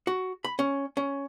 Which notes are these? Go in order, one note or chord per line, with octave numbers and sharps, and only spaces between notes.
F#4
B5
C#4
C#4